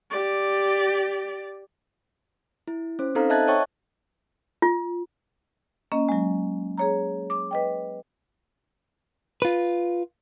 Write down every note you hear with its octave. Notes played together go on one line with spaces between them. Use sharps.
G4 D5
E4
C#4 C5
C4 D#4 A4 C5 F5 A#5
D#5 E5 A5 F#6 G#6 A6
C#5 E5 G5 C#6 A6
F4
A#3 C#4 D#5
F#3 G#3
G#4 C#5 A#5
D6
B4 D#5 G5
F4 B4